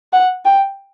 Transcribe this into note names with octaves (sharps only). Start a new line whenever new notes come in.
F#5
G5